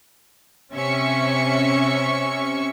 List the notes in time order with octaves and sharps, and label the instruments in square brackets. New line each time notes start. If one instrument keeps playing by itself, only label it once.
[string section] C3 C#4 E5 C#6 C#7